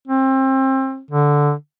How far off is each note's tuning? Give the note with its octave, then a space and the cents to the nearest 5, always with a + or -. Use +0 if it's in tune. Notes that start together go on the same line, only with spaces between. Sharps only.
C4 +30
D3 -5